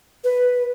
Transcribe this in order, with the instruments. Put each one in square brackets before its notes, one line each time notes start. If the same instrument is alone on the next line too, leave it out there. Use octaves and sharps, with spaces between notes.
[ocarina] B4